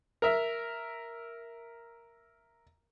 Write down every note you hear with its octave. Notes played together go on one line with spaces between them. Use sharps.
A#4 E5